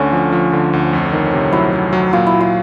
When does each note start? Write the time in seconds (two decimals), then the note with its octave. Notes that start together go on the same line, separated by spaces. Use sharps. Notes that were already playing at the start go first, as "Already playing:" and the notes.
Already playing: D2 D3 C#4
0.12 F3
0.32 F3
0.53 D3
0.73 D2
0.93 F2
1.13 D#3
1.33 C3
1.53 F#3 E4
1.74 F#3
1.93 F#3
2.13 A#2 F4
2.27 E4
2.34 A#2
2.41 F4